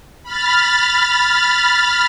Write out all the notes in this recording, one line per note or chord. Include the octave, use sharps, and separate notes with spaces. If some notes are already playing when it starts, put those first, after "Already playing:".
B5 F6 A6